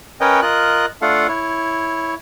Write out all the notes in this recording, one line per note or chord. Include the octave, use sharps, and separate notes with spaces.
C#4 A#4 B4 C#5 D#5 G5
F4 A#4 D#5 F#6
A3 D4 F4 A4 F5 F#5
E4 C#5